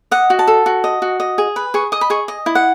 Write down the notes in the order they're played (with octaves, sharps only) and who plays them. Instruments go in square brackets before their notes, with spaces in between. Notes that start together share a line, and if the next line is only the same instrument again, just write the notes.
[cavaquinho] D#5 F#5
F#4
A5
A4
F#4
D#5
F#4
D#5
G#4
B4
G#4 C#6
D#5 D#6
B5
G#4 C#6
D#5
E4
F#5